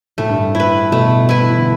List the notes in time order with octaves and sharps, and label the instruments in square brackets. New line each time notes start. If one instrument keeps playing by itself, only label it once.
[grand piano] A2 [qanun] A3
[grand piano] G2
A2
[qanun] E4 B4
[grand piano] B2 [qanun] A3
[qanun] E4 B4
[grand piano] E3
D3